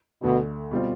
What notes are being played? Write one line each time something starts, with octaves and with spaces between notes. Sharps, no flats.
D2 B2 D3 A3
B2 G3 C4 F4